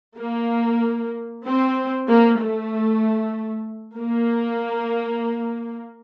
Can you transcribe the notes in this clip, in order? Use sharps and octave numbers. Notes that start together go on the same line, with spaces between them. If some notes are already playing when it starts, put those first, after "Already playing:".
A#3
C4
A#3
A3
A#3